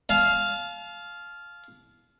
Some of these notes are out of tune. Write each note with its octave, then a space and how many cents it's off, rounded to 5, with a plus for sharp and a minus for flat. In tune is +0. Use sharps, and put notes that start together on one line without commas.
F5 +0 A5 -40